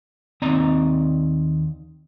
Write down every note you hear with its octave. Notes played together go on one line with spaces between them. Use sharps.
D#2 C4 D#4 D5 D#5 A#5